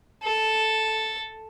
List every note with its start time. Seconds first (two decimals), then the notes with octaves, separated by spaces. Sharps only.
0.23 A4